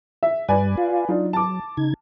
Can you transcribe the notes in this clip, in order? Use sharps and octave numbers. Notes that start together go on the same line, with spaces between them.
E5
G2 G3 B4 D5 G#5
F4 F5
F#3 D4 D#4 F4
A5 D6
C#3 D#4 G#6